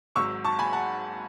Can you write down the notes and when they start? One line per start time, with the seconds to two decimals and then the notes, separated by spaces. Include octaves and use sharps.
0.15 G#1 G#2 F#3 C#6 E6
0.44 A5 C#6
0.59 G#5 B5
0.73 F#5 A5